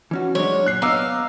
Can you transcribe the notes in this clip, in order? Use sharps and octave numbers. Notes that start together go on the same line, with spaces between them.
E3 C#4 F#4
F#3 G#3 D4 C#5
A#2 F#6 C7
B3 D#5 F5 A#5 D6 E6